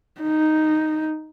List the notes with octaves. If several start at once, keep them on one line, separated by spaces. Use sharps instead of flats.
D#4